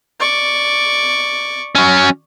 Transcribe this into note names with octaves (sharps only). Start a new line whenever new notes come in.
D5 C#6
F#3 C#4